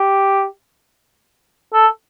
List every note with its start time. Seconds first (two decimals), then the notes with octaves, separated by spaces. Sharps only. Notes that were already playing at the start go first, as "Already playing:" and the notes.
Already playing: G4
1.73 A4